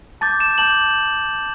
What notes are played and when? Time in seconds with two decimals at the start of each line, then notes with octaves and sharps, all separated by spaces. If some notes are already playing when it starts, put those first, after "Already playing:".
0.21 A5 D6 G6 A6
0.40 E7
0.58 A5 D6 G6 F#7